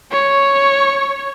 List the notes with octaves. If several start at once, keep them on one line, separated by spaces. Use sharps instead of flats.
C#5